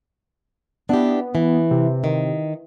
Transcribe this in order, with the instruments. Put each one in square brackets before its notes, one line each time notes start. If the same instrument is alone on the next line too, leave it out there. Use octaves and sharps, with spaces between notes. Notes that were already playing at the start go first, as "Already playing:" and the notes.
[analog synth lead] B3 [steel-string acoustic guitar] D4 E4 G4
[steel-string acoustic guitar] E3
[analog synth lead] C3
[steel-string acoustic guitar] D#3